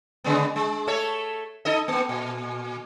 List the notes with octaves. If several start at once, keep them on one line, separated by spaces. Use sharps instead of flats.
C#3 G#3 B3
G#3
A3 A4 C#5
D#4 A4 D#5
A#3 B3
A#2